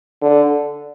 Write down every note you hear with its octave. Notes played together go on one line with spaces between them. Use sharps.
D3